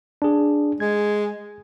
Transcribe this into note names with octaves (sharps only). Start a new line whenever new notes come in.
D4 G#4
G#3 G#6